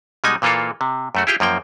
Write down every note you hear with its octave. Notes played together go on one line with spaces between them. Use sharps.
B2 G3 G#3 D#4 G#5
A#2 E3 A#3 F4 A4
C3
F#2 A3 F#4
E4 F4 G4 G#4 G5
F#2 F3 A#3 G5